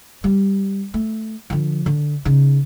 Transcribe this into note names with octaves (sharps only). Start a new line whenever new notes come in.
G3
A3
D3 F3
D3
C#3 D#4